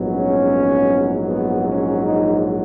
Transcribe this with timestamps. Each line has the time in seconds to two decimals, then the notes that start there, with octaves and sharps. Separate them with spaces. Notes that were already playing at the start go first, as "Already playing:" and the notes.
Already playing: A#1 G#2 F#3 B3
0.12 C#4
1.28 B3
1.69 C#4
2.07 D#4